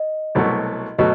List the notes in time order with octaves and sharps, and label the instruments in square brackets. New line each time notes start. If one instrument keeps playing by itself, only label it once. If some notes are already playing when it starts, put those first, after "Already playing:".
Already playing: [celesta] D#5
[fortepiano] C2 B2 F#3 A3
[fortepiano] B2 F#3 A3 [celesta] D#5